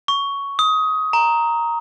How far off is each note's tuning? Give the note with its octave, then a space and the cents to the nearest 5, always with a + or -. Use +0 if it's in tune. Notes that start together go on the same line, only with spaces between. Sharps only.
C#6 +10
D#6 +20
A#5 +0